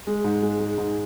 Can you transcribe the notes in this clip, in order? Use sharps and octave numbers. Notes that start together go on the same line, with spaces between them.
G#3
G#2
G#3
G#3
G#2